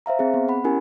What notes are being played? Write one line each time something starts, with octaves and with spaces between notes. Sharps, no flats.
C5 E5 F5 A#5
C4 G#4
B3
F#5 B5
C#4 E4 G4 A#4 G#5